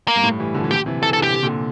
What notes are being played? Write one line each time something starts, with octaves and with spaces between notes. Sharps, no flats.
A#3
G2
A2
E3 G3
D3 F3
E3
A#2 D3 G4
C3 E3
E3 A4
A4
D3
G4
C3
A#2 D3